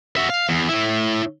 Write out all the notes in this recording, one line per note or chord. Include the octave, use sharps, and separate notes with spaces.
F#4 E5
F5
E2
A2 E4